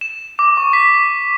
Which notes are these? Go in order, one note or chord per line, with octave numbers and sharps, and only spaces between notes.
E7
D6
C#6
B6